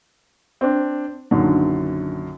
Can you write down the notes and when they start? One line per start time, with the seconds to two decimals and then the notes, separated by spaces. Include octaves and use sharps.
0.61 C4 D4
1.31 A#1 F#2 D3 D#3